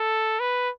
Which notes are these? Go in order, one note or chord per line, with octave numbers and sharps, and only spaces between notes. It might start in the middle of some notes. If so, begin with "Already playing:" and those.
Already playing: A4
B4